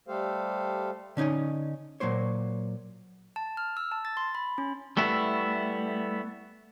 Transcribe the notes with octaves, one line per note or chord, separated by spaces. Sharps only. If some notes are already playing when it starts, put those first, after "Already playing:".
G3 A3 G4 A4 C5 F5
D3 C#4 D#4 C#5 G#5
A#2 F#3 A#3 C5 C#5
A5
F6
E6
A5
A6
C6
B5
C#4
G3 A3 B3 E4